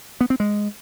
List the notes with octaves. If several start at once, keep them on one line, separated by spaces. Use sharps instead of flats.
B3
C4
G#3